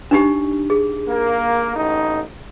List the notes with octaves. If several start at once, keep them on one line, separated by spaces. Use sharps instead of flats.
D4 D#4 G4
G#4
A#3
A1 D#4